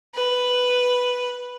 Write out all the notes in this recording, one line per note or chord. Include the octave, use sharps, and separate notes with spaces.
B4